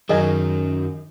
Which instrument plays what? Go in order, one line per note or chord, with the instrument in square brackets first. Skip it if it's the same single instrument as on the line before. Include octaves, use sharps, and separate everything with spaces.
[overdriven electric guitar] F#2 F#3 [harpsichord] D#3 [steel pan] G#4 D#5 G#5